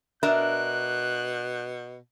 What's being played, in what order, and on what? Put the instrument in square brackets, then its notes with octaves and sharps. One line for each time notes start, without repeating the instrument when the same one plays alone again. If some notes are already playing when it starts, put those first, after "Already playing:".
[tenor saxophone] B2 [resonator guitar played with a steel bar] D4 A#4 E5 [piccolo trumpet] F#6